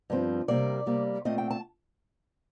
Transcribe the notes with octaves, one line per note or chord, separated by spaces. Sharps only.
G2 F3 C4
C3 G3 A#3 D5
C3 G3 A#3
A#2 A3 C4 D#5
G5
A5